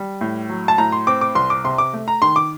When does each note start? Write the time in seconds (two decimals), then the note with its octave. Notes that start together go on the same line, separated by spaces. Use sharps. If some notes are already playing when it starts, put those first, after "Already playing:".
Already playing: G3
0.21 A2
0.49 F#3
0.68 A5
0.78 A2 A#5
0.92 C6
1.07 C4 D6
1.21 D6
1.35 C2 C6
1.50 D6
1.64 C3 C6
1.78 D6
1.93 A3
2.08 A#5
2.22 D#3 C6
2.36 D6